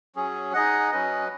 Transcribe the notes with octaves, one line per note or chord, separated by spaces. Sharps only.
F#3 C#4 G#4
D#4 G#4 D#5 F#5
F#3 C#4 B4 D#5